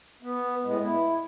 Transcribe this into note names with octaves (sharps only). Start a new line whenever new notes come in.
B3
A2 G#3 B3
E4